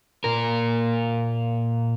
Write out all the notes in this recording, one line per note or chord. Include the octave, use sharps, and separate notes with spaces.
A#2 A#4